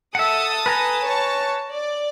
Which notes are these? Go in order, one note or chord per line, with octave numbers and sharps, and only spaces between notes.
A4 E5 F#5 A5 D#6
B4 G#5 A#5
C#5 A5 C#6
D5